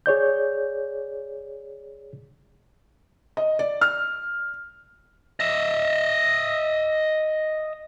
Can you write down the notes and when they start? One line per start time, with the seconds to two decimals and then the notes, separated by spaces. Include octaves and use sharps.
0.06 G#4 C#5 D5 G6
3.37 D#5
3.59 D5
3.81 F6
5.40 D#5 E5